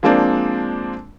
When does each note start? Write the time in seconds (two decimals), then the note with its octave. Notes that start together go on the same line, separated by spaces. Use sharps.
0.03 F3 G#3 A#3 C4 D4